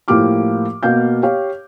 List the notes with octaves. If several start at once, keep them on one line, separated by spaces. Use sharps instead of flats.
A2 F3 A#3 G4 D6 F6
B2 A#3 F5 G6
G4 C#5 F5